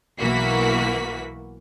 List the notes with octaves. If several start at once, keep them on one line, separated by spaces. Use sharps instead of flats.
B1 E3 A#3 F#4 B6